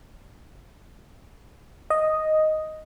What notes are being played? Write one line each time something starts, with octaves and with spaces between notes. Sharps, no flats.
D#5